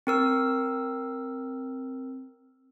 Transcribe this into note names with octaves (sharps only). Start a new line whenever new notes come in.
C4 A#4 E6